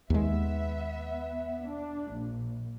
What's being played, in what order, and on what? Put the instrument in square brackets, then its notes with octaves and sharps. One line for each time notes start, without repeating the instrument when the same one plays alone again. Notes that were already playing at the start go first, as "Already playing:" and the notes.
[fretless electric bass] D#2 G#3 [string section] B3 E5
[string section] D4
A#1